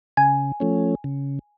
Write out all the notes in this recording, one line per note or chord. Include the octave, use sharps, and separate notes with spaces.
C#3 G#5
F3 A3 C#4
C#3